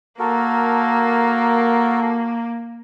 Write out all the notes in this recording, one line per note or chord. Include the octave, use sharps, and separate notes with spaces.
A#3 F#4 A4 A#4